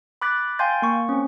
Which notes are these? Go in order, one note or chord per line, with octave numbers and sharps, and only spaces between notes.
B5 D6 F#6 A6 B6
F5 G5 G#5 C6 G6 A6
A#3 C#6
C4 C#4